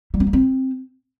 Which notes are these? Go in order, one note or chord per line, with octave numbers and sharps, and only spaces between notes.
G3
C#4
A#3
C4